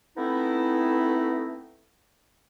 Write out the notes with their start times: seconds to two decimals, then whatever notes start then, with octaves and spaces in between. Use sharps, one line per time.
0.16 A3 B3 C4 D#4 E4